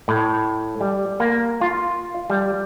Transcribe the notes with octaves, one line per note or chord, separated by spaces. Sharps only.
A2
G3
A#3
F4
G3